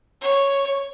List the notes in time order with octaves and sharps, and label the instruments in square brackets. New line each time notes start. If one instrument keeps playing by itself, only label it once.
[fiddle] C#5